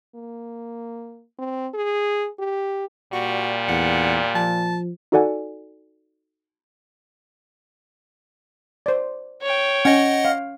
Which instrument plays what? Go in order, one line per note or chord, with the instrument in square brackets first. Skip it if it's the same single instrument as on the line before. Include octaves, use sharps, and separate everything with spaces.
[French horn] A#3
C4
G#4
G4
[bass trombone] A#2 [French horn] G3 [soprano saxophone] F#4
[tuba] E2 [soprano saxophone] F#5
[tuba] F3 [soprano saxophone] A5
[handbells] D#4 F#4 A4 D5 F#5 G#5
[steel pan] C5 D5
[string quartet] C#5 G5
[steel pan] C#4 [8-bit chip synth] D#5 F#5
[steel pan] F5